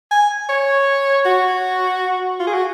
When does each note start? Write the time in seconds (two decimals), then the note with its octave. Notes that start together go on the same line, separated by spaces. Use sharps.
0.11 G#5
0.49 C#5
1.25 F#4
2.39 F4
2.47 G#4
2.53 F#4